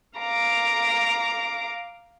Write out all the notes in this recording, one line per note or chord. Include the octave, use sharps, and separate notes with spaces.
F5 A#5 D6